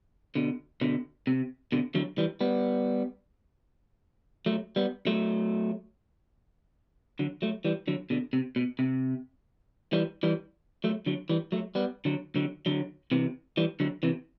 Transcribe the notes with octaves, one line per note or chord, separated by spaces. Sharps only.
B2 D3
B2 D3
C3
B2 D3
D3 F#3
E3 G3
G3 B3
F#3 A3
G3 B3
F#3 A3
D3 F#3
F#3 A3
E3 G3
D3 F#3
B2 D3
C3
B2
C3
E3 G3
E3 G3
F#3 A3
D3 F#3
E3 G3
F#3 A3
G3 B3
D3 F#3
D3 F#3
D3 F#3
C3 E3
E3 G3
D3 F#3
C3 E3